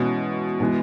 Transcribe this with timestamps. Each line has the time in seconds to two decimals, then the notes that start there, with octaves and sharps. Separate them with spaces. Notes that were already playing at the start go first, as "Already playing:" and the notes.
Already playing: B2 E3 G#3 C#4 F#4
0.60 B2 E3 G#3 B3